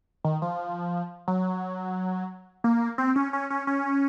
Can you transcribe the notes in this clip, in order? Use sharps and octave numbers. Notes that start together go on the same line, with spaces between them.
D#3
F3
F#3
A#3
C4
C#4
C#4
C#4
C#4